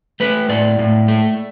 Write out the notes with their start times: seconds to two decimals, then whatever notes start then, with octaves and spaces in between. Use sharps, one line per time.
0.20 A3 B4
0.49 A2 D5
0.79 A2
1.08 A3